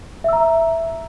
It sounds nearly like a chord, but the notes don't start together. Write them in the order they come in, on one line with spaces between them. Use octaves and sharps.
E5 E6 A#5